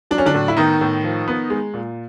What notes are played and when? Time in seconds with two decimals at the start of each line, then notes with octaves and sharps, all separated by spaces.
0.11 F#3 D4
0.18 C#4
0.26 D3 D4
0.34 A2
0.48 E4
0.57 D#3 B3 D#4
0.81 A2
1.04 F3
1.28 B3
1.50 G#3
1.74 A#2